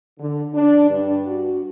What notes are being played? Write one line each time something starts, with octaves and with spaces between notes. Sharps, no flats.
D3
D4
G2
F#4